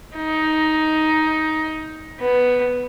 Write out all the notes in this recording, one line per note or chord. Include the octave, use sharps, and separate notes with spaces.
D#4
B3